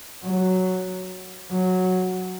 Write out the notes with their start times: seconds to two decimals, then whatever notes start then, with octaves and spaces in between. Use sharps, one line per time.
0.23 F#3
1.50 F#3